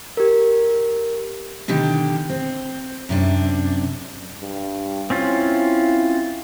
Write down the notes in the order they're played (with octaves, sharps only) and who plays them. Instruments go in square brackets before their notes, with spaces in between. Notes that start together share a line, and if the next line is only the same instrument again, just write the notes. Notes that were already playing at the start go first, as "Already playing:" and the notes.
[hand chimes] G4 A#4
[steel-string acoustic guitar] B2 D3 D#3 G4
C4
F#2 C3 D4
[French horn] G2
[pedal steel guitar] C4 C#4 F4 [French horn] E4